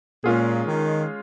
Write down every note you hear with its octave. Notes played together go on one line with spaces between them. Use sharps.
A#2 G#3 C#4 F4 G#4
D#3